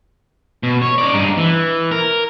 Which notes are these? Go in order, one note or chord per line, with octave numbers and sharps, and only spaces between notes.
B2
C#5
D#4 D5
G2 D#4
E3
A#4